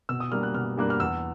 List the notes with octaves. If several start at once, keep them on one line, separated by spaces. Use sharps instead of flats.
B2 E6
D#6
G3 A#3 D4 F6
F#6
B2 F6
G3 A#3 D4 F#6
F6
E2 E6